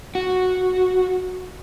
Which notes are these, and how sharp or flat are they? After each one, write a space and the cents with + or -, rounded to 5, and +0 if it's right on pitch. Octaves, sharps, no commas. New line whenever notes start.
F#4 -5